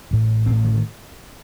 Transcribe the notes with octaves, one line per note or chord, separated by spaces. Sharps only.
A1 A2
A1 A2 C4
D#3
D#3